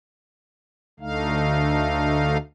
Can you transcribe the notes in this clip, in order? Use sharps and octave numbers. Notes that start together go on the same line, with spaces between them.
D2 D3 A3 D#4 F5